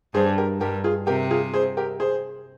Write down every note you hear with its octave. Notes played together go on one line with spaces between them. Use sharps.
G2 G#4 C5
G4 A#4
G2 G4 A#4
F4 G#4
C3 G4 A#4
F4 G#4
G#4 C5
G4 A#4
G#4 C5